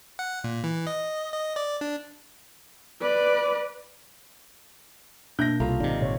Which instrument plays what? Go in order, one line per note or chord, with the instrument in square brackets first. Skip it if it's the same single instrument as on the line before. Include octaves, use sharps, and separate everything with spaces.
[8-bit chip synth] F#5
A#2
E3
D#5
D#5
D5
D4
[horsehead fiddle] B4 D5
[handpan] B2 A#3 E5 [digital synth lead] D4 [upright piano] G6 A#6
[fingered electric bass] C2 [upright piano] F4 [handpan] A4 [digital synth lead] A#5
[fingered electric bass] G#1 C3 [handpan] D#4 D5
[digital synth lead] A#2 [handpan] C#5